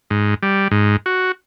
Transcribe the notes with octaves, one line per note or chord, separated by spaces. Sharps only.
G#2
G3
G#2
F#4